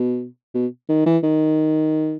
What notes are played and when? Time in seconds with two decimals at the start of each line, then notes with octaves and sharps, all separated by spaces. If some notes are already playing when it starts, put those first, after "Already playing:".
Already playing: B2
0.54 B2
0.89 D#3
1.06 E3
1.23 D#3